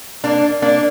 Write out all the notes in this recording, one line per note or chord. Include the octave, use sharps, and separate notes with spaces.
A#3 D4
A#3 D4